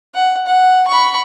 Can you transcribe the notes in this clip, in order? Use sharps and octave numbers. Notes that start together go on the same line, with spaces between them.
F#5
F#5
B5 C#6